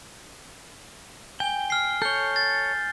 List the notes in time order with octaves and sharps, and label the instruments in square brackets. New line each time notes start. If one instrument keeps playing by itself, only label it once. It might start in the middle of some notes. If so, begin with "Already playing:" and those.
[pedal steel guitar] G5 [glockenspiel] G#5 G7
[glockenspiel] F6 C7
[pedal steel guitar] A4 C#5 [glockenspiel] G6 G7
[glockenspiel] A6